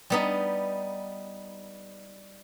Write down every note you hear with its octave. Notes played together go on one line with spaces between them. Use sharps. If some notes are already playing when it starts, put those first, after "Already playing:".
G3 B3 D#4